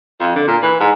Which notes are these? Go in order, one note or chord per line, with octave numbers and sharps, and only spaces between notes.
F2
D3
A#2
E3
G#2